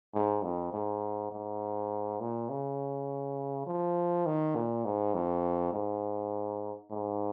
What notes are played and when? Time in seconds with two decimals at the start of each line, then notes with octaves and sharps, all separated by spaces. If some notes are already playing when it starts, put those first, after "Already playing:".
0.14 G#2
0.43 F2
0.73 G#2
1.31 G#2
2.20 A#2
2.50 C#3
3.67 F3
4.26 D#3
4.55 A#2
4.85 G#2
5.14 F2
5.73 G#2
6.90 G#2